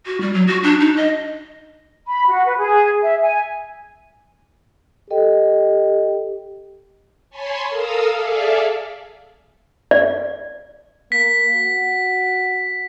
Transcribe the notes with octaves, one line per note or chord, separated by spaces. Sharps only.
F#4
G3
F#3
F#4
D4
D#4
D#5
B5
F#4
B4
G#4
E5
G#5
G4 A4 D#5 G5
C#5 G#5 A5 B5 C6
A4 A#4 F5 D#6 E6
G#4 A4 D5 E5 F5
D5
A#3 B6
F#4